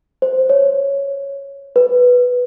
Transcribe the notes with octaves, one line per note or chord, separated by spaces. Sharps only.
C5
C#5
B4